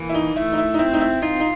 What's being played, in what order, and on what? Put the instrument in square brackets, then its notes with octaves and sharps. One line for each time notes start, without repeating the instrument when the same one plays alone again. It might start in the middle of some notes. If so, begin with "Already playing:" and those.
Already playing: [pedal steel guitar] E3 A#3
[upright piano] E4
D#4
[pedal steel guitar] A3 [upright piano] E4
[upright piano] D#4
E4
D#4
[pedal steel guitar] C4 [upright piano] E4
[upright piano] D#4
E4
[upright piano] D#4 [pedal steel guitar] F4
[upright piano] D#4